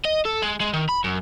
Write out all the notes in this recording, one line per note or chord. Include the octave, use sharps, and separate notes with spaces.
D#5
A4
G#3
G#3
D#3
B5
F#2